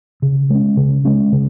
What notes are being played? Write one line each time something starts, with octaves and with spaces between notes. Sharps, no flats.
C#3
G#3 C#4
C#3
G#3 C#4
C#3